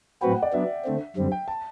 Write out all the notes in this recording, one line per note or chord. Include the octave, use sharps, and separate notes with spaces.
A2 F#3 C4 F#4 B4 G5
F#5
D5
F#3 B3 D4 E5
D3 A3 C4
F#2 D3 G3 C4
G5
A5